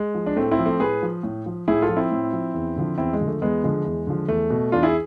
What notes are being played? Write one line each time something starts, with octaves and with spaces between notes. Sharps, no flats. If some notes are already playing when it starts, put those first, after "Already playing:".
Already playing: G#3
F3
D4
A2 A3 C4
C4 E4
F3
A3 C4
A2 G#4 B4
F3
A2
F3
A2 E4 G#4
F4 A4
F3
C4 E4
A2
F3
E2
D3 F3
E2 C4 E4
G#3
D3 F3
A3
E2 G#3 B3
D3 F3 G#3
E2
D3 F3
E2 A3
B2
E2 D4 F4
E4 G#4